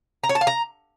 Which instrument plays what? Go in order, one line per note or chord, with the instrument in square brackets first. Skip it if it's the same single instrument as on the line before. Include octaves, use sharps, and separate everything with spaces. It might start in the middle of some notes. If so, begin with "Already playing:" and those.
[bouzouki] A#5
C#5
A5
F5
A#5